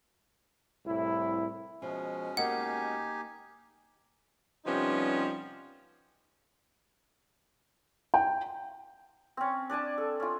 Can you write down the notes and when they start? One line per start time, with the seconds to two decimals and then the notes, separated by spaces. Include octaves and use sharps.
0.86 C2 A2 E4
1.82 B2 F3 G#3 C#4
2.37 A#3 D#4 G4 D#5 F#5 G#5
4.65 C3 F3 G3 B3 C#4 D#4
8.14 G5
9.37 C4 C#4
9.70 D4 D5 G#5 A5
9.98 A4
10.20 C#4 F4